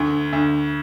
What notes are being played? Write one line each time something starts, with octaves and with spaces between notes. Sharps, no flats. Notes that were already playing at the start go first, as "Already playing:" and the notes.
Already playing: D2
D2